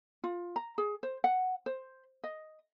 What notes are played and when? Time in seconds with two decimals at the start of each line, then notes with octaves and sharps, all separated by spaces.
0.24 F4
0.56 A#5
0.78 G#4
1.03 C5
1.24 F#5
1.66 C5
2.24 D#5